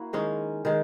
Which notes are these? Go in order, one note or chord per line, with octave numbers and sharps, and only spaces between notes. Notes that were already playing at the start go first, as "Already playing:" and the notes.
Already playing: A#3 E4 F#4
D#3 G#3 C#4
D#3 G#3